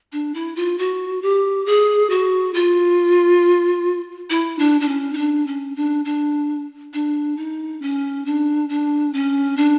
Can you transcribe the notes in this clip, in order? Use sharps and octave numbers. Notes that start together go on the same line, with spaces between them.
D4
E4
F4
F#4
G4
G#4
F#4
F4
E4
D4
D4
C#4
D#4
D4
C#4
D4
D4
D4
D#4
C#4
D4
D4
C#4
D4